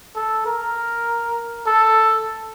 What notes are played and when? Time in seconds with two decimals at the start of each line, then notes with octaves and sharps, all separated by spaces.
0.16 A4
0.46 A#4
1.66 A4